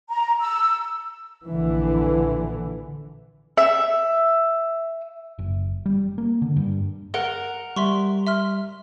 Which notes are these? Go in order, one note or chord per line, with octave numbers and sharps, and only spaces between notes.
A#5
E6
A#1 D3 E3
E5 E6
F#1
G3
A#3
D3
G2
A#4 F#5 G7
G3 E5 C6 C#6
E5 C6 F6